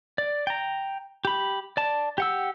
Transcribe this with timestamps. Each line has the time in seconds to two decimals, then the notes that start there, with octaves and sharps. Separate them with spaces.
0.18 D5
0.47 G5 A#5
1.25 G4 B5
1.77 D5 A5
2.18 G4 F#5 E6